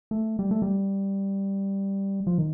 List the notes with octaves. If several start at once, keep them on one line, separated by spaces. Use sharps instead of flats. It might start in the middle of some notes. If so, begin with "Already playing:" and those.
A3
G3
A3
G3
F3
D#3